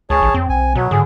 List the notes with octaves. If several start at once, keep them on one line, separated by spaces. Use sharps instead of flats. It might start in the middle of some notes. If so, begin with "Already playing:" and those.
C#2 G#4 C#5 A5
A1
F2 C4
B1 G#5
B2 F#3
G#2 D3 G#4